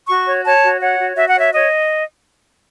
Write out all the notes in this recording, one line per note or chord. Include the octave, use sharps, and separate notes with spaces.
F#4 C#6
C#5
C#5 A5
F#4
C#5 F#5
F#4
F#4 E5
F#5
C#5 E5
C#5 D#5